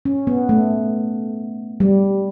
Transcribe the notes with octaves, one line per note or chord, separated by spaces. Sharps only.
C#4
B3
A3
G3